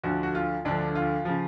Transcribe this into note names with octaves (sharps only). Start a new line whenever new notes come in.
D2 D3 F3 F#4
F#4
F4
D2 D3 F3 D4
F4
C#3 F3